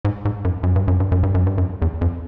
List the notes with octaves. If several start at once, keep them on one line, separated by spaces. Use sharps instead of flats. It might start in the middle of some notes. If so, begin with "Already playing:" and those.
G#2
G#2
F#2
F#2
G2
F#2
G2
F#2
G2
F#2
G2
F#2
E2
F2